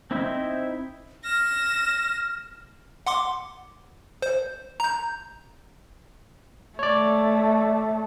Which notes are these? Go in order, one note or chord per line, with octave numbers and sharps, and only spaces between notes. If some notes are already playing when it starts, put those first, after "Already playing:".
C4 D#4 E4 C5 E5
F6 A#6 E7
F#5 C6 D6
C5
A#5 G6
A3 C#5 D5